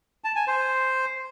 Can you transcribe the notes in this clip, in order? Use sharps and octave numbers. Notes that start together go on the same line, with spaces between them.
A5
G#5
C5